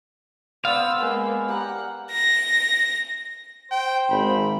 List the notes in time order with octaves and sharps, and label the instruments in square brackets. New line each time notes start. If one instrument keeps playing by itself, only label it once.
[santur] B3 C5 D5 [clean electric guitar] F5 [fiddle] E6
[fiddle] G#3 A#3 [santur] B3 B4 G#5
[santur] G4 A#5 [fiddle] F#5
[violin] A#6
[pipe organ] C5 [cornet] G5
[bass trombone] G#1 [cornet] B5